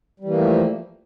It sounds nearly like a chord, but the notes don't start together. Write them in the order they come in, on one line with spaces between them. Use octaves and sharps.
G3 E3 A#3 A3 F3